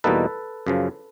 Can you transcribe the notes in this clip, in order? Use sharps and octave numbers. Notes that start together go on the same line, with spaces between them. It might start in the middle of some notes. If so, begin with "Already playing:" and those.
E2 B2 G3 A#3 D#4 A4 B4
F#2 C#3 F3